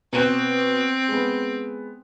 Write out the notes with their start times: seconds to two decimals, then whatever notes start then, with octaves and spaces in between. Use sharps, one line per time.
0.13 B2 C4 F#6 E7
1.08 G#3 B3